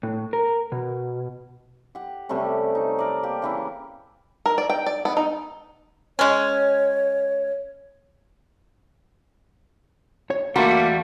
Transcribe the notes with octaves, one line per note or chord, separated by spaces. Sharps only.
A2
A#4
B2
G4 F#5
C3 G3 A3 C#4
D#4
A#4 D5
A#3 G4
C#3 E3 E4
A#4
D5
G5
D5
B3
D#4
G#3 C#4 C#5
C#5
E2 G3 A3 A#3 F#4 A#5 C6